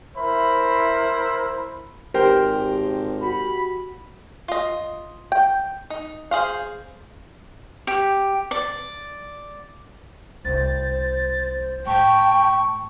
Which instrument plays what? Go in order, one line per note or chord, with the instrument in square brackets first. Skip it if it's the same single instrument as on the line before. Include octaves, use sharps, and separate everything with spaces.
[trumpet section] E4 A#4 C5 E5 B5
[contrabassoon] G#1 [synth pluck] G4 [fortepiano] A#4 C5 G5
[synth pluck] F#4 [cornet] B5
[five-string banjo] F4 D#5
G5
D#4
G#4 C5 F5
[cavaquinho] G4
D5
[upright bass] C2 B2 [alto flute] C5 [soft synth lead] A6
[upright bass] A2 [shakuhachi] G5 [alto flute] A5 [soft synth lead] C#6